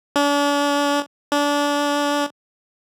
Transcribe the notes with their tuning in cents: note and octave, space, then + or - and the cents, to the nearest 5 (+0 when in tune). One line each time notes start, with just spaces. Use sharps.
D4 -40
D4 -25